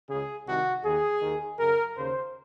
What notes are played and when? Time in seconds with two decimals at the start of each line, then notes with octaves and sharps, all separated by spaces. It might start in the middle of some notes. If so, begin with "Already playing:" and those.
0.09 C#2 C#3 G#4
0.47 C2 C3 D#3 F#4
0.84 D#2 D#3 G#4
1.22 D#2 D#3
1.59 F#2 C#3 A#4
1.96 D#2 C#3 C5